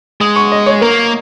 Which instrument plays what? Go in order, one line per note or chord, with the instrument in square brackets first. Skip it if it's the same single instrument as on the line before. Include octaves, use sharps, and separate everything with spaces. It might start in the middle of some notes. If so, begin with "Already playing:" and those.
[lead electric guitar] G#3 [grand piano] D#6
[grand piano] C#6
D#5
C#5
[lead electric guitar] A#3 [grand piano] A#4